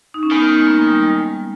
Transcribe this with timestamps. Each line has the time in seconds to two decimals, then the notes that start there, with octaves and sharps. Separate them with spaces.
0.14 D#4
0.23 C#4
0.31 D#3 G#3 B3
0.59 G#3
0.67 A#3
0.74 G#3
0.87 G3
1.02 G3
1.14 G#3